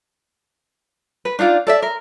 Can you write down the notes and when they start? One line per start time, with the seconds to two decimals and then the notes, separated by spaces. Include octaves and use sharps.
1.25 B4
1.39 D4 D#4 F4 D5
1.67 A4 D5 E5
1.82 A#4